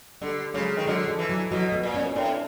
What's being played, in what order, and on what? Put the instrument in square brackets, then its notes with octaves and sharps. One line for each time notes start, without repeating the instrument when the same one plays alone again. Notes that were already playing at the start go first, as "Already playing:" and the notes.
[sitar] D3 [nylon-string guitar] G3 A3
[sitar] C#3 [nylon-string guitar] F#3 G#3
[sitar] D#3
[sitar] D3 [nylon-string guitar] F#3 G#3
[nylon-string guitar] F3
[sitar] E3
[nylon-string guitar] F#3
[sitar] B2 [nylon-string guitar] F#3
[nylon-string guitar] A3 B3
[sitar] A#2
[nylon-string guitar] B3 C#4
[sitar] A2 [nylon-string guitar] C4 D4